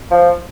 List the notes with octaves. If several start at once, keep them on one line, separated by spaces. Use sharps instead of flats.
F3